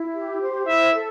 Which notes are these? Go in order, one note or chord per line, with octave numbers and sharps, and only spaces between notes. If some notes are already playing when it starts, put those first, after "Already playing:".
Already playing: E4
G4
C5
E4 E5
A4